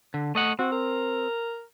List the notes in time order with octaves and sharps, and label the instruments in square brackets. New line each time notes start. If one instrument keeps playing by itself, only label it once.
[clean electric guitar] D3
A3 D#5 F#5
[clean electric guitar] C4 [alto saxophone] F#4
[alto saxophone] A#4